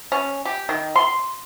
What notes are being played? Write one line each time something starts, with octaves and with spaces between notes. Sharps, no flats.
C#4
G4
D#3
C6